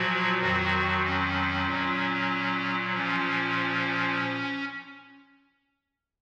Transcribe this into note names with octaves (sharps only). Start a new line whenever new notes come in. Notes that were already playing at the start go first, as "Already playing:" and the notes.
Already playing: A#2 F3 F#3 F#4
F2 D#3 F#3 F#4
C#4
A#2 F#3
A#2 F3 C#4